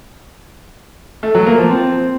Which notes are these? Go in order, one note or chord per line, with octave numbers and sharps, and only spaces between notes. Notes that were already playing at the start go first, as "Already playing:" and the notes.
A3
F#3
A#3
F3
C4